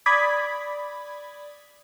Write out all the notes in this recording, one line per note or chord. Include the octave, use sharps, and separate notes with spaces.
D5 B5 D#6 G#6 B6